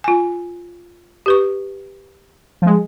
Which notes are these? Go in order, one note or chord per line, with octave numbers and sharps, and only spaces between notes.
F4 G#5
G4 B4 C#6
F3 G#3